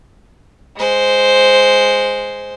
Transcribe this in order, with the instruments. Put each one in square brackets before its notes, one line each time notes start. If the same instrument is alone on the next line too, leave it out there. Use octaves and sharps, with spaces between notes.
[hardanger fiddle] G#3 C5